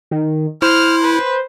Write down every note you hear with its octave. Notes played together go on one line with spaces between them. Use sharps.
D#3
E4 C5 F6
B4